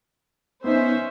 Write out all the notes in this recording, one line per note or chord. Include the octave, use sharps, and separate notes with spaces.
B3 C#4 D#4 C5 E5